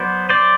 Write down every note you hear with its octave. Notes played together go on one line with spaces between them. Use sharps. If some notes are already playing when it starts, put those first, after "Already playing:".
Already playing: F#3 B3 C5 D5
C5 D5